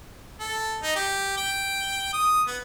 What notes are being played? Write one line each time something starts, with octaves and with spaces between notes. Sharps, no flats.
A4
D#4
G4
G5
D#6
B3